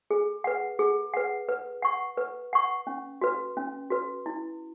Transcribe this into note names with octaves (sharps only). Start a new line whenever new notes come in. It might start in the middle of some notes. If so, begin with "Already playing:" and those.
G#4
B4 F#5
G#4
B4 F#5
B4
F#5 C#6
B4
F#5 C#6
C#4
F#4 B4
C#4
F#4 B4
E4